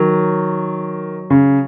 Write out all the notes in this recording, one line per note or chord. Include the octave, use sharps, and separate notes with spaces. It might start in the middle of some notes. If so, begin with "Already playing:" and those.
Already playing: D#3 F#3
C#3